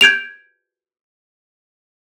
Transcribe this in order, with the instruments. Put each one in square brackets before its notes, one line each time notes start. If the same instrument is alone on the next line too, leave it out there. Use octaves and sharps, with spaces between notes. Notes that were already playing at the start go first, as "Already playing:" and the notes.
[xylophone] G6 G#6 D7 F7